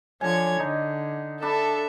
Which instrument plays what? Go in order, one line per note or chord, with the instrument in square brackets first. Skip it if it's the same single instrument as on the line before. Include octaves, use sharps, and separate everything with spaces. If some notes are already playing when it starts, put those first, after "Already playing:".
[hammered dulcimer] D3 G#5 [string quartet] F3 C#5 G#6
[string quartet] D3 [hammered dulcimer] D#4
[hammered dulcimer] D4 B5 [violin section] A4 [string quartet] E5